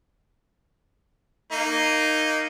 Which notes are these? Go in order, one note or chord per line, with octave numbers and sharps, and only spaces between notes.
A#3 D#4